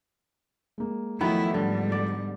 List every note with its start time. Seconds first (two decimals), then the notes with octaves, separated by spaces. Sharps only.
0.78 G#3 A#3
1.21 D#3 F3 F#3 A3 B3 E4
1.54 G#2 D3 G3
1.92 D5